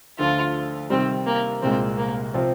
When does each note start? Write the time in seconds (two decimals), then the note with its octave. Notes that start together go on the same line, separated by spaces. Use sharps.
0.19 D2 D3 F3 F4
0.90 C3 D#3 G3 C4
1.26 A#3
1.62 C2 A#2 G#3 C4
1.98 A#3
2.34 C3 F3 C4